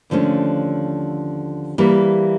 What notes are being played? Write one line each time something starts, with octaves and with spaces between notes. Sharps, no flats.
D#2 D3 F3 A3 C#4
E3 G3 A#3